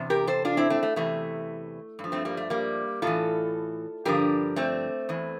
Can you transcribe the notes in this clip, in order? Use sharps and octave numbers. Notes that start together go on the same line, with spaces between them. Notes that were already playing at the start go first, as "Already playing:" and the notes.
Already playing: E2 C3
G4 A#4
A4 C5
D4 F4
C4 E4
A3 C4
A3
E2 C3 E3 A3
G2
F3
A3 C4
G3 A#3
A3
G3 A#3
A2 E3 F4 A4
G2 D3 F3 G4 A#4
A3 C4
E2 E3